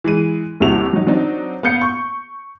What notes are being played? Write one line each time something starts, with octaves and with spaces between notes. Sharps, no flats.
E3 G#3 D#7
G1 D#2 C3 E4 F#4 F7
F#3 D#4
F#3 C4 D4 D#4
B3 F5 G6 C#7
C#6